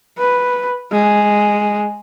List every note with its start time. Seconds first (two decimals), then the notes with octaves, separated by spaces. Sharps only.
0.18 B4
0.92 G#3